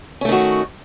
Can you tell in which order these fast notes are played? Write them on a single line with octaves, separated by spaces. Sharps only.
C#4 A3 D#3 F#4